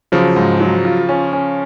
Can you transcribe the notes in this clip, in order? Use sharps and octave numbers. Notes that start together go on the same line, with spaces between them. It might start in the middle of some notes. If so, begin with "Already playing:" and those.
C#3 F3 F#3
G#2
F#3
F4
C#4
C#4